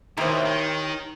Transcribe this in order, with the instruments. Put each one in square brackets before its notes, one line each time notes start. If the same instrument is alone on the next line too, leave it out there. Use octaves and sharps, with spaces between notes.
[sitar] D#2 [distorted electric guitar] B2 [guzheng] E4 [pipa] A#4 C5
[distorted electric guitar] D#3